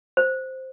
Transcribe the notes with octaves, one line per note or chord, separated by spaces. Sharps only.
C5